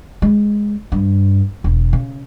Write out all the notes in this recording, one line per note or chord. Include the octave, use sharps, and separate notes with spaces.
G#3
G2
E1
C#3